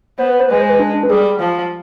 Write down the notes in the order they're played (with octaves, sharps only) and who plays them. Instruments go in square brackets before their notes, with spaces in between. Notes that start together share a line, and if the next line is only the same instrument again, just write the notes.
[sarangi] B3 [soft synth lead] C5
[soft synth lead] B4
C5
[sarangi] G#3 [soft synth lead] B4
[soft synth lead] C5
B4
D4
D4
B4
[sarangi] G3 [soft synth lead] G#4
[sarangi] F3